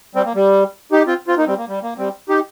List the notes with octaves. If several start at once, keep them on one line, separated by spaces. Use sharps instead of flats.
G3 C4
A#3
G3
D#4 G4
C4 F4
C4 F4
A#3 D#4
G3 C4
A#3
G3
A#3
G3 C4
D#4 G4